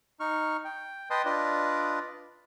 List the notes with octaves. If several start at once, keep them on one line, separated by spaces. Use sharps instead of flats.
D#4 C#6 F6
G5
B4 D#5 G5 A5 C6 D#6
D4 F4 B4 D5 D#5